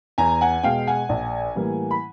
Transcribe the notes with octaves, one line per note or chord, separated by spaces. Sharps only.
E2 G#5 A#5
F#5 G#5
B2 G#3 F5 G5
F#5 G#5
A#1
A2 E3 G3 A#3
B5